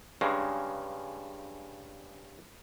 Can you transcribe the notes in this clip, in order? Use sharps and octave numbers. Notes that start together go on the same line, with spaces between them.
G2 C#3 G#3